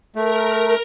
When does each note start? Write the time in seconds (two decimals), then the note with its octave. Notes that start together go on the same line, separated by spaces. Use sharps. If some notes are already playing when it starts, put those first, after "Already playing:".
0.15 A3 A#4